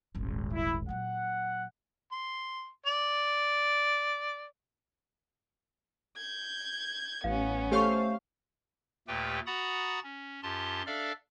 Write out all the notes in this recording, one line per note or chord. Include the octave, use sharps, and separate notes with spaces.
D#1 G#1
E4
A#2 F#3 F#5
C6
D5
G6 G#6
A1 B3 C#4 F5
A3 G4 C5 C#5 F5 C#6
D#2 A#2 A3 G4 B4 G5
F#4 F#5 A#5 B5 D#6 A6
C#4
F#2 F4 G4 A5 C6
D4 A4 D5 E5 F5 F6